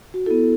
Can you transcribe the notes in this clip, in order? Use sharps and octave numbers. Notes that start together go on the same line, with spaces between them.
F#4
B3 E4 A4